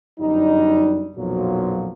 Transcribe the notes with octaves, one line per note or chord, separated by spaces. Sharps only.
G1 F#2 G3 D4 D#4
B1 F2 A#2 F3 F#3